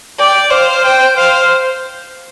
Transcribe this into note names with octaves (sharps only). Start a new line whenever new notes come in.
D5 G5
C5 F5
G5
C5 F5